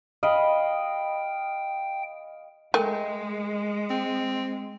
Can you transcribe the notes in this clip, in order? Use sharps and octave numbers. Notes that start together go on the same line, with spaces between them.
D#5 F5 G5 B5
G#3 A3 A#4 G5 G#5
C4